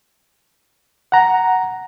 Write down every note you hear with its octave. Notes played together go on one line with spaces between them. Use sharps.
F#5 A#5